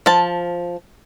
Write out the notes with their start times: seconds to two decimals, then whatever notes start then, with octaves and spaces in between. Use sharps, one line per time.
0.06 F3 A5